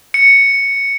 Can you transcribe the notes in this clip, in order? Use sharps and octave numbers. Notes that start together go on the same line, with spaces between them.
C#7